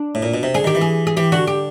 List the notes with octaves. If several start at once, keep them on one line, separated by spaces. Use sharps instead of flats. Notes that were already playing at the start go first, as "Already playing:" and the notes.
Already playing: D4
A2
A#2
B2
C3
D3 G#4
D#3 G4
E3
G#4
G#4
E3 G4
D3 F#4
G4